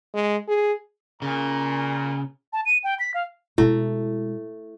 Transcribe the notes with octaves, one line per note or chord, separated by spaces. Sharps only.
G#3
G#4
A#2 C#3 A#5
A5
D#7
G5
B6
F5
B2 G#3 A3 E4